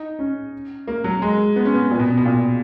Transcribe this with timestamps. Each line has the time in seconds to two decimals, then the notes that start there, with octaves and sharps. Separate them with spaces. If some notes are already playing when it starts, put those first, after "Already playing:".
Already playing: D#4
0.19 C#4
0.87 A#3
1.04 F#3
1.22 G#3
1.56 B3
1.65 C#4
1.74 B3
1.91 A#2
2.00 B2
2.17 B2
2.26 A#2